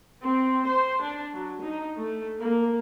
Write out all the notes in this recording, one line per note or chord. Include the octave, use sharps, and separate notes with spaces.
C4
C5
D4
F#3
D#4
A3
A#3